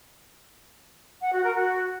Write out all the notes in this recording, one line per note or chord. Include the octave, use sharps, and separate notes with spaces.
F#5
F#4
A#4
F#4